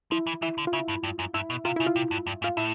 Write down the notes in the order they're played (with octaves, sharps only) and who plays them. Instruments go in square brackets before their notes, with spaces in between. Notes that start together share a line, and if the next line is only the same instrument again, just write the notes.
[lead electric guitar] F3 [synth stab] E4
[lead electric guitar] E3
[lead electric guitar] E3 [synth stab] E4
[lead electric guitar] D3
[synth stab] F4
[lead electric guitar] C#3 [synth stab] E4
[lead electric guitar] G2
G2
F#2
[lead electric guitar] G2 [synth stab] E4
[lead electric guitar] B2
[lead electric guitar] C3 [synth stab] F4
[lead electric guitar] C#3 [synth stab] E4
[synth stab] F4
[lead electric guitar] C3
G2
G2
[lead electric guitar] G#2 [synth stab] F4
[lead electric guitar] A2 [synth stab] E4